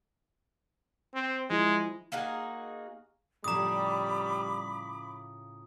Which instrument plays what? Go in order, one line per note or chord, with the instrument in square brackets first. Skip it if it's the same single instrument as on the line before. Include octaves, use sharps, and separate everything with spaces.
[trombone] C4
[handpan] F3 E4 [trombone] G#3
[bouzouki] A#3 D#4 F#4 G#4
[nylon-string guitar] A2 C#3 F3 [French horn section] G3 [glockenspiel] A#5 D#6 [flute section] B5 D6